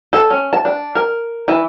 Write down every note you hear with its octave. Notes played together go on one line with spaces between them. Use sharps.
A4
C#4
A5
D4
A#4
E3